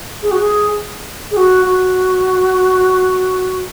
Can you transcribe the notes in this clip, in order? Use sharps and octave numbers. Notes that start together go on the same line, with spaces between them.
G#4
F#4
G#4
G#4
F#4
F#4